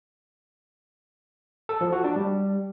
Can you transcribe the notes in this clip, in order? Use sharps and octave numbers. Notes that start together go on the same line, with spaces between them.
A4
F3
F#4
D4
G3